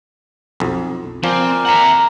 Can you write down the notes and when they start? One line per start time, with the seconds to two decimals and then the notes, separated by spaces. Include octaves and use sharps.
0.60 B1 F2
1.24 F3 C4 A#4 D5 G#5
1.66 E5 F#5 A#5